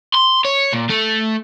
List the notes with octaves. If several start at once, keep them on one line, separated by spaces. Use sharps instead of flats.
C6
C#5
A#2
A3